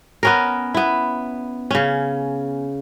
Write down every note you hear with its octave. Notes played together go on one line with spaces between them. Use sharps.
B3 C#4 A#4
B3 E4
C#3 C#4